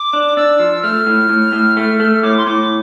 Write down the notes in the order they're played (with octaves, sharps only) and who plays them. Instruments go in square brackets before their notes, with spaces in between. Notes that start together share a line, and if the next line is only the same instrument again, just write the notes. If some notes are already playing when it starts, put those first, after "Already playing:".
Already playing: [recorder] D6
[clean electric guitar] D4
[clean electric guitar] D4 [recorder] E6
[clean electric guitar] F3
[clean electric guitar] A3 [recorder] F6
[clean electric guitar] A2
A2
A2
A3
A3
[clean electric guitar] A2 [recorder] D6
[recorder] C6
[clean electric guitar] A2 [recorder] D6